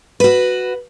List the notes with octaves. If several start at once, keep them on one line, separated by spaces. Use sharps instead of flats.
F#4 B4